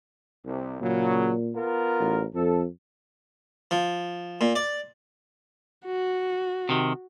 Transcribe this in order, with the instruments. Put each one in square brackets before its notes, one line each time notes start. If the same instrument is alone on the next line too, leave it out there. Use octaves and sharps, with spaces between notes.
[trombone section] C2
[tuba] A#2 [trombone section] C#3 F#3
[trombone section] B3 F4 A#4
[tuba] A1
[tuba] F2 [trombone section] A4
[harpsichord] F3
A#2
D5
[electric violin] F#4
[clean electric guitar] C3 D#3